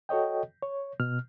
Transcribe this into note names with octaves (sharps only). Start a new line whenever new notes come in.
F#4 A4 C#5 D#5 G5
C#5
B2 F6